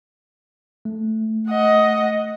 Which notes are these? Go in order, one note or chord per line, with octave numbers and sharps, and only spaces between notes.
A3
D#5 F#5